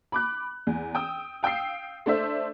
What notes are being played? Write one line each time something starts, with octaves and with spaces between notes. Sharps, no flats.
B5 D6 F#6
E2
G5 D#6 E6
F5 G5 D#6 E6 C7
A3 D4 C5 E5